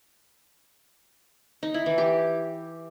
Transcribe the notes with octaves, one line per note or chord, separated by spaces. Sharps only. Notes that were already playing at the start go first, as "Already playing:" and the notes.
D#4
E4
E3
G4